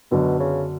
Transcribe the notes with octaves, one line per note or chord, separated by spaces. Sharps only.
F#2 B2 D3 F#3 B3 D4
C#3